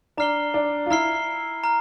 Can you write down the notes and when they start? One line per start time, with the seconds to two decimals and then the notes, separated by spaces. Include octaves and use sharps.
0.17 D4 A#5 F6 C7 G7
0.54 D4
0.86 F4
0.90 E4 A#5 F6 C7 G7
1.64 A#5 F6